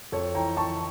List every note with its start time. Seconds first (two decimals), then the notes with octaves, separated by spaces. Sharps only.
0.12 F2 A4 C#5
0.35 E3 G5 A#5
0.57 E3 A5 C#6